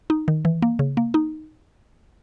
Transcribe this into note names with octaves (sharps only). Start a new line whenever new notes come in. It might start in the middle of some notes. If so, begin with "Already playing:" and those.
D#4
D#3
E3
A#3
C#3
A#3
D#4